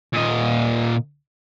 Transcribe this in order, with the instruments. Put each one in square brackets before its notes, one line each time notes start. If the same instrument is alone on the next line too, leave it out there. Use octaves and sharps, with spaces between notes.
[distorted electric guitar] A#2 D#5